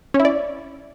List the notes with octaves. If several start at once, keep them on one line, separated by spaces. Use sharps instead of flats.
C#4
E4
D5